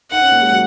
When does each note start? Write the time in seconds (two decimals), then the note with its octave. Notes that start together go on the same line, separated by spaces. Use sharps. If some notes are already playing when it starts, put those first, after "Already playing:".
0.11 D#4 F#5
0.22 C#4
0.32 A#3
0.41 G#3
0.52 F#3